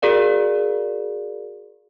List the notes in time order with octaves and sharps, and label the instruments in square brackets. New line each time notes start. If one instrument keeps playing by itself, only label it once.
[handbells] F#4 G#4 A#4 D5 F5